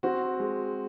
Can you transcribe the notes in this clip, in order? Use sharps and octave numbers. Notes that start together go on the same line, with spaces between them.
C4 F#4
G#3